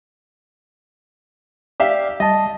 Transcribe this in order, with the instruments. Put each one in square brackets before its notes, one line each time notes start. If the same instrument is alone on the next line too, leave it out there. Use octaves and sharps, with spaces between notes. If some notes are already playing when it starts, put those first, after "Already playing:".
[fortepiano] G4 E5 F5 [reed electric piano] D5
[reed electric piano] G3 A5 [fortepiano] D#5